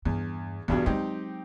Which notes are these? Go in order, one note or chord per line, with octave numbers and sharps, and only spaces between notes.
E2 G2
E2 G2 B2 C#4 F4
F#3 G#3 C4 D#4 G4